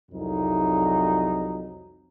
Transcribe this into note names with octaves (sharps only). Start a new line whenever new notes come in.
C2 F2 F#3 D#4